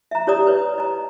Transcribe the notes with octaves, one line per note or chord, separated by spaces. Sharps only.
E5 A#5
E4 G4 C#5 D5 A#5 D#6
B4 C#5
D#5 A#5